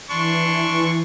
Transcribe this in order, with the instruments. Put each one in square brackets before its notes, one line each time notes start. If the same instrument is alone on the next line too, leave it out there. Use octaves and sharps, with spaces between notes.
[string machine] E3 [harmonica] D4 C6 C#6